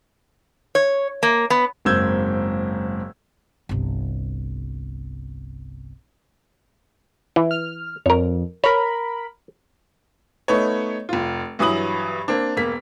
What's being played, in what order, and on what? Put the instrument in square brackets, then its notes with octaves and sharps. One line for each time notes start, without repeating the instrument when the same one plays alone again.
[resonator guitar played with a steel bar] C#5
A#3
B3
[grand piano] F#1 G#2 C4 E6 G6 G#6
[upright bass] G1 C2
[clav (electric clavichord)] E3
[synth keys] F6
[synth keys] F2 [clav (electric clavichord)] A#4 C#5
[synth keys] A#4 B5 [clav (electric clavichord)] C#5
[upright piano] A3 B3 D#4 C#5
F1 F4
G2 E3 F#3 D#6 F#7
A#3 C4 D4
E1 A#3 B6